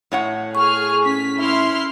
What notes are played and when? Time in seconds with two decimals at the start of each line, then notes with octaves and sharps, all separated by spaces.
0.12 A2 C#5 F#5
0.55 G#4 C#6 F6
1.06 C#4 B6
1.38 E4 C6 F6